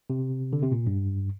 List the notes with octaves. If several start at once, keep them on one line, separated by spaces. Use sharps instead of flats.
C3
D3
C3
A#2
G2